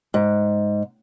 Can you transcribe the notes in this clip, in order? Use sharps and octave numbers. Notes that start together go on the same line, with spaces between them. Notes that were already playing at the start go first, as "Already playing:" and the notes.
G#2